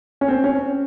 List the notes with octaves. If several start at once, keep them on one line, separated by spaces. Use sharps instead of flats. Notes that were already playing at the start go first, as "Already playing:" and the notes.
C#4
C4
C#4